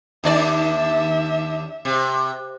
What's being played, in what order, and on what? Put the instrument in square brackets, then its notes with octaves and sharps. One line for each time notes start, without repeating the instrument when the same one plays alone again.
[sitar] D#2 D4 D5 [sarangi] E5
[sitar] C3